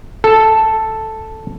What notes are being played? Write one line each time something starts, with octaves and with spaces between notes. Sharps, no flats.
A4